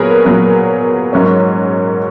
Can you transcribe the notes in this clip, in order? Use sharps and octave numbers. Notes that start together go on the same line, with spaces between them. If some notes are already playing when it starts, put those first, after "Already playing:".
Already playing: A#2 F#3 B3 G#4 A#4 B4 C#5
A#2 F#3 B3
G#2 F#3 A#3 C#4